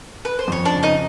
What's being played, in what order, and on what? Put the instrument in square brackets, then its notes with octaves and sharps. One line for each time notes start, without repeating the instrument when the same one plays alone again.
[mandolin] B4
C5
[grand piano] F2 [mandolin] C#5
[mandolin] D4 D5
[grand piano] C#3
[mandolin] D#4 D#5